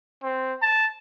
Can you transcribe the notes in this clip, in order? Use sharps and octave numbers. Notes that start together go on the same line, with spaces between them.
C4
A5